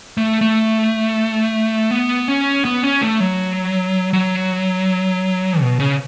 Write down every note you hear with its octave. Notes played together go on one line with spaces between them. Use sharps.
A3
A3
B3
C#4
B3
C#4
A3
F#3
F#3
B2
C#3